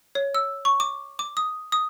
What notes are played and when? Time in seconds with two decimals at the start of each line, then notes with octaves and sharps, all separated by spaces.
0.15 C#5
0.35 E6
0.65 C#6
0.80 D6
1.19 D6
1.37 D#6
1.72 D#6